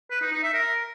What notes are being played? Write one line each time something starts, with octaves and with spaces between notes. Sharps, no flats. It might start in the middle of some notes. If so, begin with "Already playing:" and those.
B4
D#4
D#4
E5
A#4